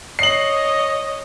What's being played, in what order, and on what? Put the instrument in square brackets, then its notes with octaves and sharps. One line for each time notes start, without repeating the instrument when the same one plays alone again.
[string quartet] C#5 D#5 [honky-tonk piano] C7 F#7